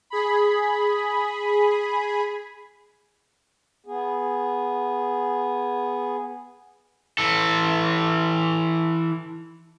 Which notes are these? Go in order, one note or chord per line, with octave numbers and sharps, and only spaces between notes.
G#4 B5
B3 G#4
E3 A4